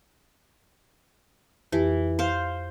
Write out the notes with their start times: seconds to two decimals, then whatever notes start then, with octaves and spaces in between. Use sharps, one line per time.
1.72 F2 E3 G4
2.19 C5 F5